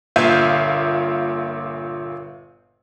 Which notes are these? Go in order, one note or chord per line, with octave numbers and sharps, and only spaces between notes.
G1 A#2 E5 F5 G6 D#7